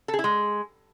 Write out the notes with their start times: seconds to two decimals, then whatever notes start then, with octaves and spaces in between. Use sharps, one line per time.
0.08 A4
0.14 G#4
0.19 E4
0.24 G#3